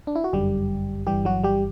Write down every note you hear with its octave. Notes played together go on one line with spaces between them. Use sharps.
D4
E4
F#4
G1 F#2 D3 G3 G4
G1 G2 E3 G3 G4
F#3 F#4
G3 G4